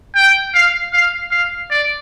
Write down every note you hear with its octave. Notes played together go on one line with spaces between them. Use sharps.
G5
F5
F5
F5
D5